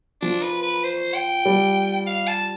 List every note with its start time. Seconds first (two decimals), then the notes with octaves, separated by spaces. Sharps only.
0.21 F3 D4
0.42 B4
0.63 B4
0.83 C5
1.14 G5
1.45 G3
2.07 F5
2.27 A5